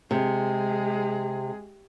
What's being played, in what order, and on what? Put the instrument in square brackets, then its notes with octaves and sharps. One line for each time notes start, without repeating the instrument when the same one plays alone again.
[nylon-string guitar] C3 [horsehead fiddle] G#3 G#4